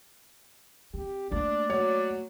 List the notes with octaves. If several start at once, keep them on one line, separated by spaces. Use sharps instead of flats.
C4 G4
A3 A#3 D4 D5
F#3 C#5